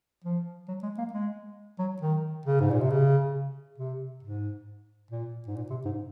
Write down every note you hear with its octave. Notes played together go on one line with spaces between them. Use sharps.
F3
F#3
G#3
A#3
G#3
F#3
D#3
C#3
G#2
A#2
C3
C#3
C3
G#2
A#2
G#2
A#2
C3
G#2